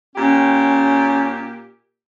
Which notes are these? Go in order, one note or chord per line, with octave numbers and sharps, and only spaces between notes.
A#2 C#4 G4